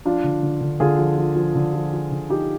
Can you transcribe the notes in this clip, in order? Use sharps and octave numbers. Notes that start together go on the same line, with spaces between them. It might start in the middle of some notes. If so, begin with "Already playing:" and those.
F3 D4 F4
D3
D3
D3
D3 F4 G#4
F3
F3
F3
D3
F3
F3
D3
F3 D#4 G4